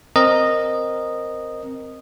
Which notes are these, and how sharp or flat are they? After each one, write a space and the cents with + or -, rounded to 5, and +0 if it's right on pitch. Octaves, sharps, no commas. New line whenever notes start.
C4 +0 A#4 +0 D#5 -10